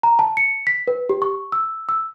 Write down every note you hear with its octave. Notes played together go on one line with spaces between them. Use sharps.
A#5
A5
C#7
B6
B4
G4
C#6
E6
E6